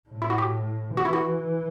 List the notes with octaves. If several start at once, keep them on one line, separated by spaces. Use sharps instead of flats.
A2
E4
F#4
G4
E3 F#4
E4
F#4